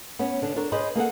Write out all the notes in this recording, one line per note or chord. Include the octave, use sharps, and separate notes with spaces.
B3 C#4
D3 D4
D4 A4 A#4 C#5
G#4 B4 C5 D#5
A#3 G#4 A4 F#5